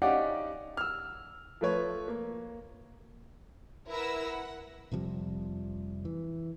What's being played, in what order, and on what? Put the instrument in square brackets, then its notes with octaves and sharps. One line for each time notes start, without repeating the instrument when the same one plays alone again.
[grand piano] C#4 D#4 G4 D5 F5 F#5
E6 F6
F3 A3 B4 C#5
A#3
[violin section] E4 A#4 B4 F#5 E6 A#6
F#5
[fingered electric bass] F1 C3 F3 G3
E3